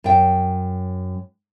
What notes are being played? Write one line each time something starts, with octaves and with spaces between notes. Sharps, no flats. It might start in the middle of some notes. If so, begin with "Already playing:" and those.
F#2 G5